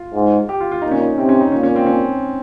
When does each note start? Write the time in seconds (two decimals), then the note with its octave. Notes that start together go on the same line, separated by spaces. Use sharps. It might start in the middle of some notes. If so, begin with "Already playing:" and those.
Already playing: F4
0.14 G#2
0.49 G4
0.60 F4
0.71 F4
0.82 A#2 D#4
0.91 C#4
1.01 D#4
1.17 C3 C4
1.29 C#4
1.41 D#4
1.52 A#2 C#4
1.63 C#4
1.76 C4
1.86 C#4